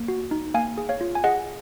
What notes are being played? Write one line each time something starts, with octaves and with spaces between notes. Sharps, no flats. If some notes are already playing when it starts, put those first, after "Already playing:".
Already playing: A#3
F#4
D#4
A#3 F5 G#5
G#4
C#5 F5
F4
G#5
G#4 D#5 F#5